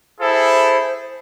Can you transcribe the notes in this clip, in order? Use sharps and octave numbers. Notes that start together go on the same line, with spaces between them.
E4 G#4 A4 C5